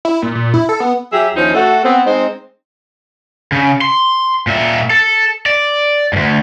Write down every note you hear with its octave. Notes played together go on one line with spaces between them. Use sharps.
E4
A#2
A#2
E4
A4
B3
F#3 G4 G#4 E5
D#2 F3 C#4 D#4 E4 C5
A3 F#4 A4
B3 C4
G#3 C4 D#4 C5
C#3
C6
A#2 E5
A4
D5
D2 G#2